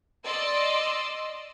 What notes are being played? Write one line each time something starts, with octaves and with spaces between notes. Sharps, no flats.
D5 D#5 C6 E6